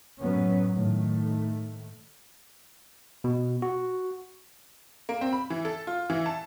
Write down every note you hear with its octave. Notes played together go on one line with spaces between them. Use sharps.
F#2 A2 F#3 B3 C#4
A2 D#3 A3
B2
F#4
A#3
C4
B5
E3
A4
F4
E3
A5